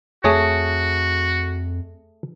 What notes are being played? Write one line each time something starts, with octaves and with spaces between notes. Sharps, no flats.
F2 A3 F#4 G#4 C#5